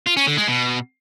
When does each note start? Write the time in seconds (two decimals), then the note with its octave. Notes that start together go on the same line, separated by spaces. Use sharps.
0.07 F4
0.17 C#4
0.27 D3
0.37 G#3
0.48 B2